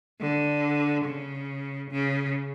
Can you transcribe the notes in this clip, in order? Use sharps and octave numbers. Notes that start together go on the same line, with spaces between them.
D3
C#3
C#3